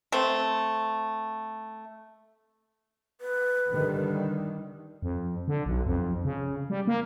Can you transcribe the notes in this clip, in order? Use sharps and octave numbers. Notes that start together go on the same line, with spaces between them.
A3 C4
B4
D3 D#3 G3
F2
D3
B1
F2
C#3
G3
A#3